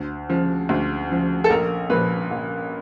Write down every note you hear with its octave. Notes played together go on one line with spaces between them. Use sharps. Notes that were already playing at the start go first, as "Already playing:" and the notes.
Already playing: D2
C#3 F3
D2
C#3 F3
A4
A#1 A#4
A#2 F3 B4
A#1